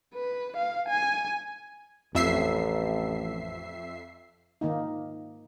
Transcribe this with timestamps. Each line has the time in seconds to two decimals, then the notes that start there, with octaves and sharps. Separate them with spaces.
0.15 B4
0.57 F5
0.88 G#5
2.15 A1 F2 E5 C7
4.61 D#3 A#3 D#4